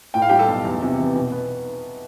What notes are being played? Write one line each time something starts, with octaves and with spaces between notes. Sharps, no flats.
A2 G5
F5
G3 G4 G5
A4 A5
B1
E2
C3
E3
B2
B3